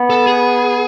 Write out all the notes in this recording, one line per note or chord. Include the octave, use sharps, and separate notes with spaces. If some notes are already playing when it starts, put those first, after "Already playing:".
Already playing: B3
A4
G#4